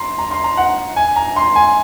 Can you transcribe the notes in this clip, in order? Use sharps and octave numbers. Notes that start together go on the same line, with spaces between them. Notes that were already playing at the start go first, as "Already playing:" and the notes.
Already playing: A#5 C6
A#5
C6
A#5
F#5
G#5
A#5
C6
G#5